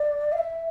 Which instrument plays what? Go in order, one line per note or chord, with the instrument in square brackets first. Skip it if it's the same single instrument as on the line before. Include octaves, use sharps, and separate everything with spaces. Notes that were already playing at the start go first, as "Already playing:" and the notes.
Already playing: [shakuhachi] D5
F5
E5